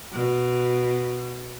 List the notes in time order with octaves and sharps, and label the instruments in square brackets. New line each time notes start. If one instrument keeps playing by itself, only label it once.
[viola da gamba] B2